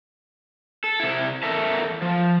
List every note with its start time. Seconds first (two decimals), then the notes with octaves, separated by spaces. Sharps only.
0.84 A4
1.00 C3 E4
1.43 E2 A4 A#4 E5 A5
2.02 F3